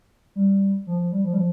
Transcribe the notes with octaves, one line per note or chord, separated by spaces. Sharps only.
G3
F3
F3
G3
F3
G3
F3